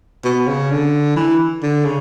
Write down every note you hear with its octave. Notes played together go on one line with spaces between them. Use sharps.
B2
C#3
D3
E3
D3
C#3